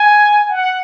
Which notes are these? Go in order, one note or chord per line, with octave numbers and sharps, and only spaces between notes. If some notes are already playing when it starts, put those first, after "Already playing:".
Already playing: G#5
F#5